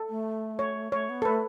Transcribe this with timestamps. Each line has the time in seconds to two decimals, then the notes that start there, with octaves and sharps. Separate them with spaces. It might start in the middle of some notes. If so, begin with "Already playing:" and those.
Already playing: A4
0.09 A3
0.59 C#5
0.92 A3 C#5
1.10 B3
1.22 A4
1.25 A3 B4